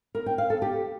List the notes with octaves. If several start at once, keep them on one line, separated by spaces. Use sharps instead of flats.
A#4
G5
F5
A4
G4